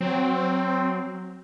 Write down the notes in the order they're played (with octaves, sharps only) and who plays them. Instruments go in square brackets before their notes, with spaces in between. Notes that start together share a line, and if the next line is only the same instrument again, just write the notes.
[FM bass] F#3 [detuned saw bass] C4